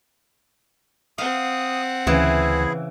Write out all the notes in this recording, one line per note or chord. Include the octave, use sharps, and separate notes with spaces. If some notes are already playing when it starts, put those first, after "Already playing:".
C4 F5 F#5 D#6
D2 C#3 E3 E4 G#4